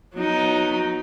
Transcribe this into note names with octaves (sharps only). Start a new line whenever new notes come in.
F#3 B3 D#4